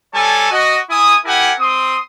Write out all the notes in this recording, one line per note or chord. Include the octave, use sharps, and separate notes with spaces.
G3 A4 C#5 G#5 A5
F#4 D#5
E4 G#5 D#6
E4 G4 A#4 F#5 G#5
C4 C6 D#6